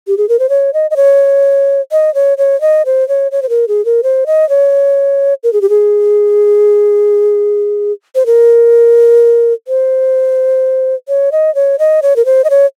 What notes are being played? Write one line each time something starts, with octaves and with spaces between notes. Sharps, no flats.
G4
G#4
A#4
C5
C#5
D#5
D#5
C#5
D#5
C#5
C#5
D#5
C5
C#5
C#5
C5
A#4
G#4
A#4
C5
D#5
C#5
A#4
G#4
G4
G#4
C5
A#4
C5
C#5
D#5
C#5
D#5
C#5
A#4
C5
D#5
C#5